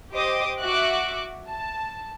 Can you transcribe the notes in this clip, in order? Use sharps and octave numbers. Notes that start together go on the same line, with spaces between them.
G4 C5 D#5 D6 D#6
F#4 E5 C#6 D6 F#6
A5